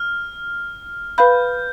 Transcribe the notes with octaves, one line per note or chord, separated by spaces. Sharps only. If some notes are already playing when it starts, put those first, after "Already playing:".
Already playing: F6
B4 F5 B5 G6